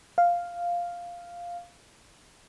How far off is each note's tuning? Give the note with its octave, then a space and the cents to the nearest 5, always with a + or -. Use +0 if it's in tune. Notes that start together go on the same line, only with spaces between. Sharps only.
F5 +0